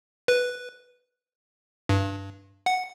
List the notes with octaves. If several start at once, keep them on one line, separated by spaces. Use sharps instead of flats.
B4
G2
F#5